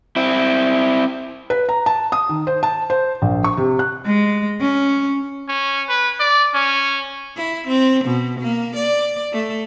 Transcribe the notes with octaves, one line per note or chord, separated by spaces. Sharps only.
C4 E4
B4
A#5
A5
D#6
D#3
C5
A5
C5
A#1
C#6
C3
F#6
G#3
C#4
C#4
B4
D5
C#4
E4
C4
B2
A#3
D5
A3